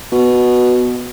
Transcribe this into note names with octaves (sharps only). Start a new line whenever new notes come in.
B2